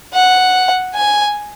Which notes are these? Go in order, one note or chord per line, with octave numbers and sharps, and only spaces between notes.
F#5
G#5